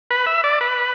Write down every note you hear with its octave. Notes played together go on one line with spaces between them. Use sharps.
B4
E5
D5
B4